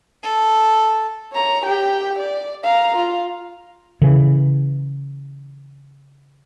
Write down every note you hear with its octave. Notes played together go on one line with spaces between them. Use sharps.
A4
C#5 A#5
G4 G5
D5
F5 A#5
F4
C#3 E3